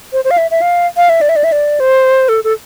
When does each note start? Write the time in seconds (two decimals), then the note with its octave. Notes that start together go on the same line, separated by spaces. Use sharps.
0.13 C5
0.25 C5
0.31 F5
0.38 E5
0.51 E5
0.62 F5
0.97 F5
1.09 E5
1.21 D5
1.29 E5
1.36 D5
1.44 E5
1.52 D5
1.80 C5
2.29 A4
2.44 A4